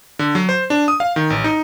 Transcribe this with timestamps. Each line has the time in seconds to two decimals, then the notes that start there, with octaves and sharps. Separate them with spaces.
0.19 D3
0.35 F#3
0.49 C5
0.70 D4
0.88 D#6
1.00 F5
1.16 D#3
1.30 A1
1.44 D#4